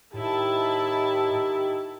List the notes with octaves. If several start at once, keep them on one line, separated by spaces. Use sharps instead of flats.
A2 D#3 D#4 E4 G4 A5